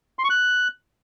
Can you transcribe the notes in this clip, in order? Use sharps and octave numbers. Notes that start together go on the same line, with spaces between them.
C6
C#6
F#6